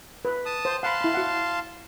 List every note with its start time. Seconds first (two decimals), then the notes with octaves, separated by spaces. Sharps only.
0.25 B4
0.46 A5 D#6
0.65 C5
0.83 F5 F#5 A5 B5 C6
1.01 E4 B5
1.14 F#4 F#5